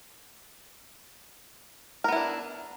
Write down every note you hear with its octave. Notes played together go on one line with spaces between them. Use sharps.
B3 D4 E4 A#4